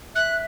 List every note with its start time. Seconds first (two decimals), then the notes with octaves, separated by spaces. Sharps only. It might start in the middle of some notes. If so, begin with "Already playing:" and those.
0.15 E5 F#6